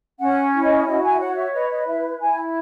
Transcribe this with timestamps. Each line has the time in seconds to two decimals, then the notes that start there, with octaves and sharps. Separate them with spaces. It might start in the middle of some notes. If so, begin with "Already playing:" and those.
0.20 C#4 F#5
0.53 E4
0.64 D#5
0.86 F#4 D#5
1.03 G#5
1.14 E5
1.20 C#5 F#5
1.37 E5
1.53 B4 D#5
1.70 D#5
1.87 E4 E5
2.20 E4 G#5